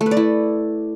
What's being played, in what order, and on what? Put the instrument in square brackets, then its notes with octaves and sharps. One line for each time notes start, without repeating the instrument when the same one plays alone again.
[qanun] A3
B4
D5
E4